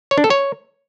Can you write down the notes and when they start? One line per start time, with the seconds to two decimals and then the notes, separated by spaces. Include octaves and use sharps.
0.11 C#5
0.18 D4
0.24 A4
0.30 C#5